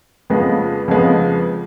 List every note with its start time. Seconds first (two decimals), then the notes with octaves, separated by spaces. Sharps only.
0.30 F2 C#3 F3 G#3 B3
0.88 F2 C#3 F3 G#3 B3